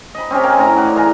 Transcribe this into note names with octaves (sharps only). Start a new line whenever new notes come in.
D#5 B5
C4 C#4 D#4 G4
A#4 F5 G5 G#5
A2 C#4 D#4 A#5
D#4 D5 F#5
E3 G#4 F5 A#5